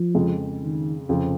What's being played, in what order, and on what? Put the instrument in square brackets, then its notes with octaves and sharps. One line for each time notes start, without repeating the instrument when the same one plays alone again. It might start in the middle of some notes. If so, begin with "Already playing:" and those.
Already playing: [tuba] F3
[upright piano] F2 C#3 G#3
[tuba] D#3
[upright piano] F1 F2 C#3 F3